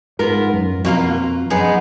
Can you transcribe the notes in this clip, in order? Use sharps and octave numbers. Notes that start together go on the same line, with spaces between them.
G#2 B3 F4 A#4
F#2
F2 B2 A#3 F4 A#4
F#2 G#3 B3 D#4